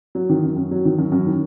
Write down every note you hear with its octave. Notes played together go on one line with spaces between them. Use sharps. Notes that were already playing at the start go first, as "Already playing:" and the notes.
F#3
D#3
F#2
F#2
F#3
D#3
F#2
F#2
D#3